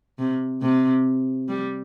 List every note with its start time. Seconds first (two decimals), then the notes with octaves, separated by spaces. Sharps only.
0.19 C3
0.62 C3
1.48 G3